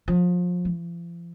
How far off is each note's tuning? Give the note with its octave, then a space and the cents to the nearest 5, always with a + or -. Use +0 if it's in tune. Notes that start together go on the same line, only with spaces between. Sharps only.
F3 +30
F3 -40